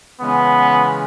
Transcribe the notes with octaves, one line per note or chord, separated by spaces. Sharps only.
C#3 E3 G#3 B3 C#4